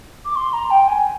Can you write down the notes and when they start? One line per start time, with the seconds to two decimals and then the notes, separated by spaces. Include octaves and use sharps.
0.25 D6
0.35 C6
0.53 A#5
0.70 G5
0.87 G#5